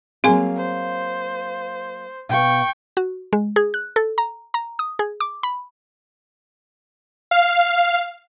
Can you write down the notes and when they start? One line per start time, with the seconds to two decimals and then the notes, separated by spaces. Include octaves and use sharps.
0.24 F#3 A#3 C4 G#4 F5 G#5
0.57 C5
2.29 B2 F5 G5 C#6
2.97 F#4
3.33 G#3
3.56 G#4
3.74 F#6
3.96 A4
4.18 A#5
4.54 A#5
4.79 D#6
4.99 G#4
5.20 D6
5.43 B5
7.31 F5